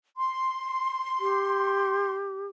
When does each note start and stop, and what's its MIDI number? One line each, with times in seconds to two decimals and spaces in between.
0.17 2.14 84
1.20 2.46 67